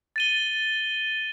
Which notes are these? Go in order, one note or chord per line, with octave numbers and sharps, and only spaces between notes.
A6 D#7 G7